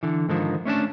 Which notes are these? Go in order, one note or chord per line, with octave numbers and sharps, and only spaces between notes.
D3 E3
G#2 D3 D#3 F3
A3 C#4 D4 A5